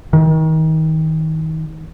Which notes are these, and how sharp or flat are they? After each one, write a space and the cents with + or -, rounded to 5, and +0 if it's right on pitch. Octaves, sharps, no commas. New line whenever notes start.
D#3 +30